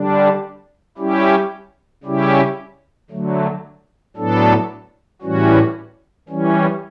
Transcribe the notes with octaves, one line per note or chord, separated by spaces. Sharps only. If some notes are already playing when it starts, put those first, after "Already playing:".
Already playing: D3 G3 D4
G3 C#4 E4 G4
C#3 G3 C#4 E4 G4
D3 F#3 A3
A2 F#3 B3 D4 A4
A2 E3 G3 C#4 F#4
E3 G3 C#4